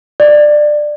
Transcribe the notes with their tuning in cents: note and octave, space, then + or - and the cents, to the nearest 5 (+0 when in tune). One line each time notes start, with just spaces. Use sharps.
D5 +20